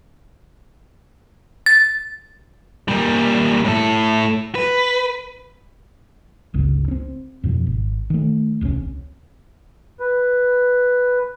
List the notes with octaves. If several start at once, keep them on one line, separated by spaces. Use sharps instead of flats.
A6
A#2 G3
A2 A4
B4
G1 C#2 C#3
C4 C#4
F2 B2 F3
G#1
D#3 A3
D#1 C2 C#3 C#4
B4